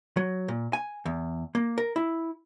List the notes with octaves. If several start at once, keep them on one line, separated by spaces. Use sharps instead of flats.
F#3
A#2
G#5
E2
A#3
A#4
E4